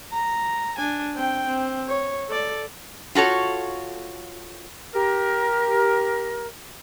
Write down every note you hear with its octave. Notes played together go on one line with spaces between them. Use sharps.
A#5
D4 G#5
C4 G5
C4
C#5
A4 D5
F4 F#4 A4 C#5
G4 A#4